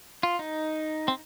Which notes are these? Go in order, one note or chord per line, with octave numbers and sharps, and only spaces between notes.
F4
D#4
C4